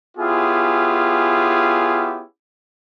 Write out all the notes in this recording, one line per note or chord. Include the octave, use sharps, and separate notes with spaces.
B3 C#4 E4 F4 G4 G#4